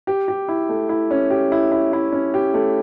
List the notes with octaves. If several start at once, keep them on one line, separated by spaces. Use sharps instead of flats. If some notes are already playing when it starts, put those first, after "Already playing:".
G4
G4
E4
A3
E4
C#4
G4
E4
E4
E4
C#4
G4
A3